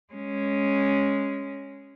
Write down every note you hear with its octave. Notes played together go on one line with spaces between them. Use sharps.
G#3 C#4